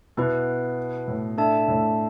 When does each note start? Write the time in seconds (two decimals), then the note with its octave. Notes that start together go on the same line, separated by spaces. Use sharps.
0.17 B2 B3 E4 B4
1.08 A2
1.38 D4 A4 E5 A5
1.68 A2